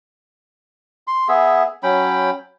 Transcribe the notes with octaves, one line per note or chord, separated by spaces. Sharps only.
C6
B3 G#4 E5
F#3 C#4 G5 B5